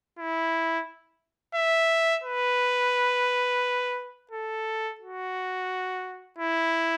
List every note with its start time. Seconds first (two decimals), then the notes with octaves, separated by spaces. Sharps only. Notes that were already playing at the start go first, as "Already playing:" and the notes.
0.18 E4
1.55 E5
2.24 B4
4.31 A4
5.00 F#4
6.38 E4